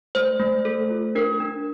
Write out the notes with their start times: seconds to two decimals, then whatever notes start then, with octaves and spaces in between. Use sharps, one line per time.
0.15 A3 C5
0.40 A3
0.65 A4
0.90 F4
1.15 D4 A#4
1.40 D4